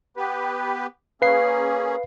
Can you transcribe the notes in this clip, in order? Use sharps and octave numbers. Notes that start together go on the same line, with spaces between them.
B3 G4 B4
A#3 C#4 G#4 B4 F5 C7